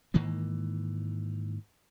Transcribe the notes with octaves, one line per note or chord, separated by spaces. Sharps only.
G#2 D#3 E3 A#3